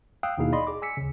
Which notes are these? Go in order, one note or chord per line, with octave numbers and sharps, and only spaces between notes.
F5 G5 D#6 E6 F#6
D#2 B2 D#4 E4 G#4 F5
D5 D#5 B5 C6
G#4 D6
G#5 E6 B6 C#7
D2 C#3